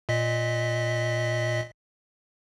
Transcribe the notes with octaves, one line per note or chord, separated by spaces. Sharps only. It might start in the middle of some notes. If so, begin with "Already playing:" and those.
A#2 D#5 B6